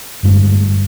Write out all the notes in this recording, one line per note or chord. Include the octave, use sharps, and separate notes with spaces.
G1 G2 G#3 A3